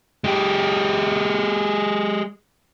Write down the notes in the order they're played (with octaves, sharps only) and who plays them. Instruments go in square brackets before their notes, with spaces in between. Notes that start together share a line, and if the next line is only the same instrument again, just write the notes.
[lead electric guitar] G#3 G4